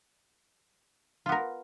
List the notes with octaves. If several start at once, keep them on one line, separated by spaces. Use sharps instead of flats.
B3 F4 A#4